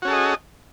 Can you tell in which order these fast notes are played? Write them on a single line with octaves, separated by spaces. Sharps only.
F#4 C#4 A4 G#4 D#5